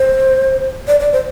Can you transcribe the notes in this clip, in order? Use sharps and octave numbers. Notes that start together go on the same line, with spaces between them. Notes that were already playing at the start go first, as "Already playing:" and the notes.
Already playing: C5
D5
D5
C5